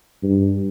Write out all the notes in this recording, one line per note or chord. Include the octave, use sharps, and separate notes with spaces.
G2